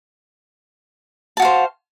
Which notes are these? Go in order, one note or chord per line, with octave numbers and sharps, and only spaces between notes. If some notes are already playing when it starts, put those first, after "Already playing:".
F#4 C5 F5 A5